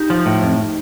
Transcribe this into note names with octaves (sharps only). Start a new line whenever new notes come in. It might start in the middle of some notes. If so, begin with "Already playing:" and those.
Already playing: D#4 G4
F3
A2
F2